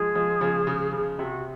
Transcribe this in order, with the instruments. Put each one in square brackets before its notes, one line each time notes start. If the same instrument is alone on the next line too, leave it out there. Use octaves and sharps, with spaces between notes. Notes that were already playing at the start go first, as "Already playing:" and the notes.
Already playing: [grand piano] F3 G#3 [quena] G#4
[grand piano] F3 G#3
C#3 F3
C#3
C#3
[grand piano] C3 [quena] F#4